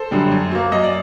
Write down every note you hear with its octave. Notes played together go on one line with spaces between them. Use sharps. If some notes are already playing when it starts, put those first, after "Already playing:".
Already playing: A4 C5
F#2 D3 G3
F#2
F#3 A#3
F#2 D#5
D5